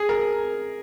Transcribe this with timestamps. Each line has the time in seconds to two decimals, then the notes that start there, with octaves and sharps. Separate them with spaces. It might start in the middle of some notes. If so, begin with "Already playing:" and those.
Already playing: G#4
0.09 A#4